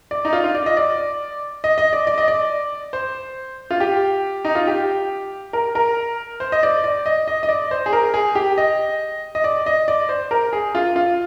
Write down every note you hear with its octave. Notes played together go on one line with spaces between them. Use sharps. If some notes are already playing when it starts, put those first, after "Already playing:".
D5
D#4
F4
F4
D5
D#5
D5
D#5
D#5
D5
D5
D#5
D5
C5
F4
G4
D#4
F4
G4
A#4
A#4
C5
D#5
D5
D5
D#5
D#5
D#5
D5
C5
G#4
A#4
G#4
G4
D#5
D#5
D5
D#5
D5
C5
A#4
G#4
F4
F4